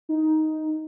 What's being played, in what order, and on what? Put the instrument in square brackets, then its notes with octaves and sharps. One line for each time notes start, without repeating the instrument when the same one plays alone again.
[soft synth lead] D#4